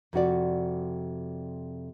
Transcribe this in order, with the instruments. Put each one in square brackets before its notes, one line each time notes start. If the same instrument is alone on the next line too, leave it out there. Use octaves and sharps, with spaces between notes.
[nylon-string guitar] F2 C3 F#4 D5